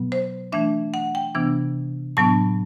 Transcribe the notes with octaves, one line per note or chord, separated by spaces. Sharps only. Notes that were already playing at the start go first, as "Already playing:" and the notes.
Already playing: B2 F#3 B3
C5
E3 A3 D4 E5
F#5
G5
C3 E3 B3 D4
A2 F#3 B3 D4 A5